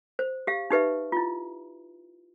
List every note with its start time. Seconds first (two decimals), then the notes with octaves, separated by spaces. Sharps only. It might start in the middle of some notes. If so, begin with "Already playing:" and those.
0.19 C5
0.47 G4 F5
0.70 D#4 G4 B4 E5
1.12 E4 F4